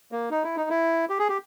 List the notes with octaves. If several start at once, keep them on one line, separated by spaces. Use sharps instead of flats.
A#3
D#4
E4
D#4
E4
G4
G#4
G4